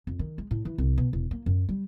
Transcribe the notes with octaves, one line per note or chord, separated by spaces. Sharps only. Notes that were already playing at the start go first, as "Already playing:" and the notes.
F2
D#3
G#3
A2
E3
C2
B2
E1
A#3
F#2
G3